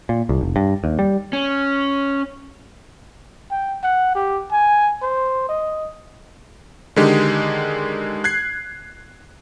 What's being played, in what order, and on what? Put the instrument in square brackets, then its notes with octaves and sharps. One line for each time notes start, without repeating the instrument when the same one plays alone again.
[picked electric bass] A#2
C2
F1
G2
D#2
G3
[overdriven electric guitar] C#4
[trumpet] G5
F#5
G4
G#5
C5
D#5
[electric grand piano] D3 D#3 G#3 G4
F#6 G#6 C7